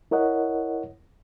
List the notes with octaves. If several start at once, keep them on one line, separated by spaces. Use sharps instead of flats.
E4 A#4 C#5 D#5 F#5